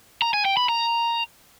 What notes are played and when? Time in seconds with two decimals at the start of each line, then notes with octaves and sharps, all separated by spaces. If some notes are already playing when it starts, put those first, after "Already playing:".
0.22 A#5
0.34 G#5
0.45 G5
0.57 B5
0.69 A#5